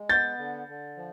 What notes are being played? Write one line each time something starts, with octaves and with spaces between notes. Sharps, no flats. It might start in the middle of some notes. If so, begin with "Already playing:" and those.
Already playing: G#3
B3 G6 A6
D3
D3
F3